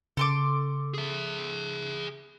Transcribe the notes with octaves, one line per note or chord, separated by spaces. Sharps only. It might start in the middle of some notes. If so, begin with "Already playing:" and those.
C#3 A4 C6 D6
G#4 E5